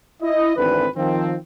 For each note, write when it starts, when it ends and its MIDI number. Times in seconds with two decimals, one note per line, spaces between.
0.22 0.56 64
0.22 0.56 75
0.57 0.87 32
0.57 0.87 38
0.57 0.87 50
0.57 0.87 52
0.57 0.87 60
0.57 0.87 71
0.96 1.35 51
0.96 1.35 53
0.96 1.35 60